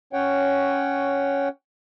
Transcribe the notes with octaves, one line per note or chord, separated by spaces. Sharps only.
C#4 C#5 F#5 G5